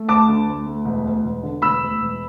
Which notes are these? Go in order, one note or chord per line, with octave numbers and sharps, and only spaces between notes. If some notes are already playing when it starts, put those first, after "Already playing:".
Already playing: A3
D2 A5 D6
D3
D2
A3
E1
D2
E1
D3
E1 B5 E6
D2
E1